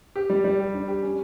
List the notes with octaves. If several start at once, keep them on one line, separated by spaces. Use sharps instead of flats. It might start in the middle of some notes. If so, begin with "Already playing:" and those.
G4
G3
G3
G4
D4
G4
C#4